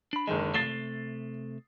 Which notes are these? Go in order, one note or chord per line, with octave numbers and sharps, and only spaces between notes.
D4 B5
F#1 D3 D#3 G#3
C3 A3 A6 C7 G7